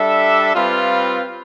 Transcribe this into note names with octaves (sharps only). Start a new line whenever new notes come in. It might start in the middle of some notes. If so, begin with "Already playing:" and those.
Already playing: G3 D4 A4 E5
G3 C4 F4 B4 F5